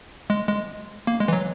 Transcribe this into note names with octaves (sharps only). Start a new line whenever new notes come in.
G#3
G#3
A#3
G#3
E3
F#3